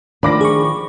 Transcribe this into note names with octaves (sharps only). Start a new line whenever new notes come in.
D#3 F3 A3 D4 F4 B5 D6 A#6
G#4 C#6